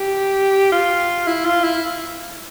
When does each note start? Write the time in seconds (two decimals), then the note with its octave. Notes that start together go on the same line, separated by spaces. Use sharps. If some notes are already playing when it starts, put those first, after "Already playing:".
Already playing: G4
0.72 F4
1.27 E4
1.45 F4
1.64 E4